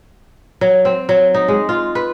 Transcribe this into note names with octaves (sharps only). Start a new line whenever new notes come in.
F#3
C4
F#3
D#4
G#3
F4
B4